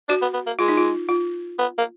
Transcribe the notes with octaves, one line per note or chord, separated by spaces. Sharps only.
D4 F#4
B3
B3
A#3
G#3 F4
D#4
F4
F4
B3
A#3